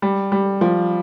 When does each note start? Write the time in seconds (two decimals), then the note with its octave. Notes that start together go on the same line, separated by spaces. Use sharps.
0.02 G3
0.32 G3
0.61 F3